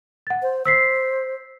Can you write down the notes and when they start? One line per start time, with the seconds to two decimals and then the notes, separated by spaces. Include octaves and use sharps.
0.27 F#5 A6
0.42 C5
0.66 C5 E6 B6 C7